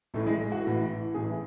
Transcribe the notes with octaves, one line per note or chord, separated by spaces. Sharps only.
A1 A2 E3 A3
G#3
F#4
A1 A2 E3
A1 A2 E3 G#4